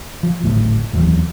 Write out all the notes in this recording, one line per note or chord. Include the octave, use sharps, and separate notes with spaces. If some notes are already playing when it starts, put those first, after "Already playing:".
F3
G#1 D2 A2
F1 D#2 E3 F#3